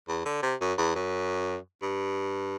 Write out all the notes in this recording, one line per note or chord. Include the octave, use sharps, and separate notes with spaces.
E2
D3
C3
F#2
E2
F#2
G2